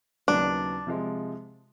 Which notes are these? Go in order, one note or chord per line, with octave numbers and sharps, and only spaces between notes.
D#2 C#3 F#3 B3 D4
C3 F3 G#3